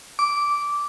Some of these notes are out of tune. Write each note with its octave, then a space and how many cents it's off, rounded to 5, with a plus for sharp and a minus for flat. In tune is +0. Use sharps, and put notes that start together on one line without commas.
D6 -10